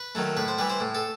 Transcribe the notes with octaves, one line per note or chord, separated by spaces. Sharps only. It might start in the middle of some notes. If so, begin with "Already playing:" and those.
Already playing: B4
D#3 F#3 A3
A2 B4
C5
E3 G3 B4
C5
A2
A4